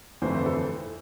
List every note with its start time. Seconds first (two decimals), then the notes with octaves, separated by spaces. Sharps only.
0.22 G1 F2 E3 A3 C5
0.34 C5
0.46 A4